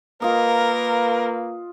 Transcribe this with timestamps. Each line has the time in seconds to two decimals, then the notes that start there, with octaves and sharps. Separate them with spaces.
0.22 A#3 F4 A#4 B4 D#5